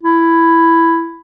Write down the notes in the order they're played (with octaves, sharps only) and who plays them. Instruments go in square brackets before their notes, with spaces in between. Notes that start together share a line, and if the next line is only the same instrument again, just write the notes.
[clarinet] E4